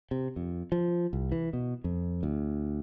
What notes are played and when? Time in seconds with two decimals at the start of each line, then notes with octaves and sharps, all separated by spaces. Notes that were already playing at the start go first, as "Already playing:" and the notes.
0.11 C3
0.36 F2
0.72 F3
1.13 C2
1.32 E3
1.53 B2
1.84 F2
2.23 D2